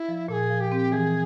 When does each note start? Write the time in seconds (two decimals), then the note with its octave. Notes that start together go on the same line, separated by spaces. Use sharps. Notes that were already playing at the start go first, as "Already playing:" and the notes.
Already playing: E4
0.08 F3
0.28 A#2 A4
0.33 G#4
0.50 F3
0.60 G4
0.72 C4
0.92 E3 G#4